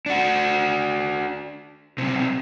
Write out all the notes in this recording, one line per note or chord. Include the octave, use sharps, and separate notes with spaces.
D4 F#4
B1 C3